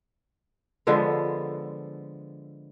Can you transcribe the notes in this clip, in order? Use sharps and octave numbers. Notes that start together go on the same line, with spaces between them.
D3 F3 G#3 B3